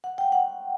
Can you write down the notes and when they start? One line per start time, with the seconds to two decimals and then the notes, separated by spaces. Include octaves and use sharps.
0.04 F#5
0.18 G5
0.32 F#5